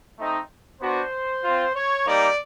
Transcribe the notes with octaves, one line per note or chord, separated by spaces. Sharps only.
A3 C4 D#4
B3 D4 F#4 C5
C4 F4
C#5
G3 A#3 D#4 G4 D5